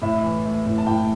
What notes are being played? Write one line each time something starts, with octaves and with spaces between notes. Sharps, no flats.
A2 E5
E3
A3
A2
A5
A2 G5